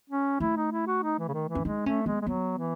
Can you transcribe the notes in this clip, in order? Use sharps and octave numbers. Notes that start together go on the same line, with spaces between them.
C#4
A3 E4
D#4
E4
F#4
D#4
E3
C#3
D#3
E3
C#4
G#3 D#4
A3 C#4
G#3 B3
G#3
F#3 B3
E3